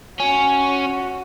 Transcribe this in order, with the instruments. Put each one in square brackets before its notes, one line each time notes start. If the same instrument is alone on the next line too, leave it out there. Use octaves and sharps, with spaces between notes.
[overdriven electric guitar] C#4 [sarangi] F#4